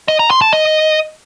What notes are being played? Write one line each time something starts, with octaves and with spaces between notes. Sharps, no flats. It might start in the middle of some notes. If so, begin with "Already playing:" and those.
D#5
A#5
C6
A5
D#5